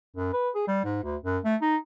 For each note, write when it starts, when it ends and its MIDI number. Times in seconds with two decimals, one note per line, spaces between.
0.16 0.30 42
0.33 0.50 71
0.55 0.65 68
0.68 0.81 55
0.84 1.00 44
1.03 1.16 38
1.23 1.38 42
1.45 1.56 57
1.62 1.77 63